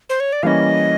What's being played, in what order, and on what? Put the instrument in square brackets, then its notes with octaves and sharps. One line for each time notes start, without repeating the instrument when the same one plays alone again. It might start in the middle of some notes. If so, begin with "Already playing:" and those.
[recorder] C5
C#5
D5
[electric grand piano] E3 G3 A#3 C#4 [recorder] D#5 F5